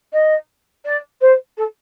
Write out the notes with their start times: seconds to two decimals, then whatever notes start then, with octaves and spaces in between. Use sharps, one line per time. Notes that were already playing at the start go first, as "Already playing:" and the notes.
0.13 D#5
0.85 D5
1.21 C5
1.57 A4